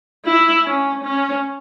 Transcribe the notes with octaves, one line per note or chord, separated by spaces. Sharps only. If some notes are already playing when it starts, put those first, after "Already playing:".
E4
C#4
C#4